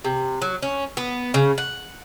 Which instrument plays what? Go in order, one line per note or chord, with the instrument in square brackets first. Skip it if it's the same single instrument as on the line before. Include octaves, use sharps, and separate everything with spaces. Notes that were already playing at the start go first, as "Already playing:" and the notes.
[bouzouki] C3
F#3
C#4
B3
C#3
F#5